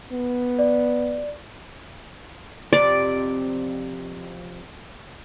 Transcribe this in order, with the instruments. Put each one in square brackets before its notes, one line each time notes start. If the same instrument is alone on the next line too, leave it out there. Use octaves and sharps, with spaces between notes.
[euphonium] B3
[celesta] D5
[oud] F2 C3 [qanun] D5